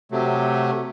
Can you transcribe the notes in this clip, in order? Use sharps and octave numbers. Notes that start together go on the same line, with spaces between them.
C3 F#3 A3